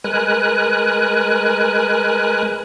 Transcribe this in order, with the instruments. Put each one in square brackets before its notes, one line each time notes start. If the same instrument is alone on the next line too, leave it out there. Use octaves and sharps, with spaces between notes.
[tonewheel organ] G#3 A#4 B4 G#5 F#6